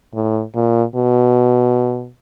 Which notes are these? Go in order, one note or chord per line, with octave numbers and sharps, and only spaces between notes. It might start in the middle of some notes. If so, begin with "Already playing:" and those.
A2
A#2
B2